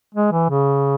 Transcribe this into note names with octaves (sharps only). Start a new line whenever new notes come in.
G#3
E3
C#3